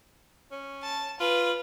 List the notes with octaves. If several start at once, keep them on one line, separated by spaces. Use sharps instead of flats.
C#4
A5
F4 B4